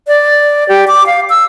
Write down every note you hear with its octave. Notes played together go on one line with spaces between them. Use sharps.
D5
G4
D6
F5
E6